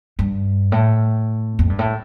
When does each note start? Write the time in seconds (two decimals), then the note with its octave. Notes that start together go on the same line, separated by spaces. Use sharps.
0.19 G2
0.72 A2
1.59 F2
1.70 G2
1.79 A2